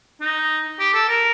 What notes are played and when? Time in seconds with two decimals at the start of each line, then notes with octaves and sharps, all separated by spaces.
0.21 D#4
0.80 G4
0.94 A4
1.09 A#4